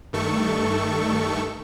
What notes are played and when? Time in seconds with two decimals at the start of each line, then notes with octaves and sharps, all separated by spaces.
0.13 G2 D#3 A3 A4 C#6